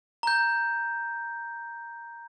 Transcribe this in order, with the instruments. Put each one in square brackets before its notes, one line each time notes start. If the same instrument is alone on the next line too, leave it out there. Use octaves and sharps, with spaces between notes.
[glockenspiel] A#5 G6